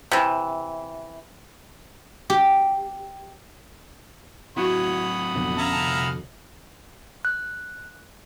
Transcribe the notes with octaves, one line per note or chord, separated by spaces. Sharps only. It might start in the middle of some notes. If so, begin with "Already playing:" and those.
C3 E3
G4
F#3 C4 E4 F#4 C#5 F#5 B5 D#6
F2 B2 D3
C#4 E5 F5 A#5
C2 A5
F#6